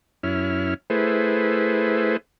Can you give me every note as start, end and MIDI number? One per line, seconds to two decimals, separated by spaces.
0.23 0.74 42
0.23 0.74 61
0.23 0.74 64
0.23 0.74 89
0.90 2.17 57
0.90 2.17 64
0.90 2.17 68
0.90 2.17 71
0.90 2.17 72